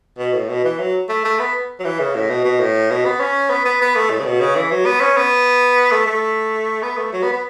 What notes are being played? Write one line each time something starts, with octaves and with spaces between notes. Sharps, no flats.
B2
A2
B2
E3
F#3
A3
A3
B3
F#3
E3
C#3
A2
B2
B2
A2
B2
B3
C#4
B3
B3
B3
A3
A2
C#3
B2
C#3
E3
F#3
B3
C#4
B3
A3
A3
B3
A3
F#3
B3
B3